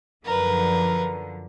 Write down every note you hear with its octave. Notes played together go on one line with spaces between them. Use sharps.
F#2 D3 F3 A#4 B4